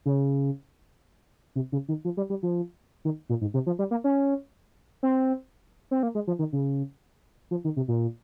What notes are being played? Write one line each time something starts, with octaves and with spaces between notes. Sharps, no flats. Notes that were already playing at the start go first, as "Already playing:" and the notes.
C#3
C3
C#3
D#3
F3
G3
G3
F3
D#3
A#2
G#2
C3
F3
G3
A#3
C#4
C4
C4
A#3
G#3
F3
D#3
C#3
F3
D#3
C3
A#2